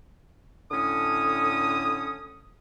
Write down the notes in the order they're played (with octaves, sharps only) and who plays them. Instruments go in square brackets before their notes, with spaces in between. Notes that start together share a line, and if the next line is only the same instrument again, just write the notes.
[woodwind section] A2 D3 C#4 D#6